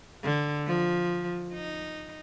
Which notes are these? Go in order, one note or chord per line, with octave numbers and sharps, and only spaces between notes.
D3
F3
D#4